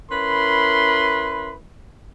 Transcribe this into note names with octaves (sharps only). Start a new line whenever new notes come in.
C#4 E4 A#4 B4 B5 C6